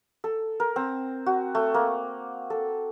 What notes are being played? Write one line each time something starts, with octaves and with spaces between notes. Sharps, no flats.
A4
A#4
C4
F#4
A3
A#3
A4